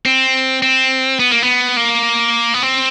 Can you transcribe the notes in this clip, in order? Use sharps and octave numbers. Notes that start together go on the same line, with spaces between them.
C4
C4
B3
A#3
B3
A#3
B3
C4